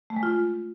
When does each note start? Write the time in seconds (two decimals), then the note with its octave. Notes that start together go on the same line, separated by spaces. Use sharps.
0.10 A3
0.16 G#3
0.23 F4